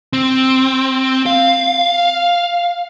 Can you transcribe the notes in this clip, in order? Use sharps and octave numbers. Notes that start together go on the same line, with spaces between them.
C4
F5